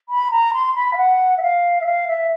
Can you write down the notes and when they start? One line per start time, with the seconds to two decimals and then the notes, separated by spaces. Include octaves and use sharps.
0.09 B5
0.31 A#5
0.54 C6
0.75 B5
0.93 F5
0.97 F#5
1.37 E5
1.42 F5
1.81 E5
1.85 F5
2.08 E5